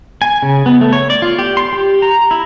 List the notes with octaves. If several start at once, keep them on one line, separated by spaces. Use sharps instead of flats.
G#5
C#3
B3
A3
C#5
D5
F4
G4
C6
G4
A#5
E4